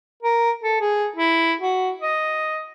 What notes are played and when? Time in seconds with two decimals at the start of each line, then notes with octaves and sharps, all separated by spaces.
0.22 A#4
0.63 A4
0.80 G#4
1.16 E4
1.60 F#4
2.02 D#5